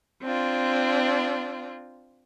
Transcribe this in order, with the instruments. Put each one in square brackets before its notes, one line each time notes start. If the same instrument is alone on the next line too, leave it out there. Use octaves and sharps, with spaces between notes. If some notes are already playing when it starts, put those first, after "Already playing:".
[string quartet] C4 D4 F4